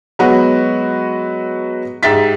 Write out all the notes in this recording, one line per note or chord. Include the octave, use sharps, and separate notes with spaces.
F#3 G#3 B3 F#4
G#2 G4 E5 A6 B6